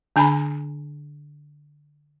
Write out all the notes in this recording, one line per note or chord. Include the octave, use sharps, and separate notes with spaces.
D3 D4 G#5 A#5 B5